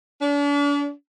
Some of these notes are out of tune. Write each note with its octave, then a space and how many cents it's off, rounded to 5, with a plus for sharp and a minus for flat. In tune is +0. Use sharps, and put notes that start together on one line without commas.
D4 -40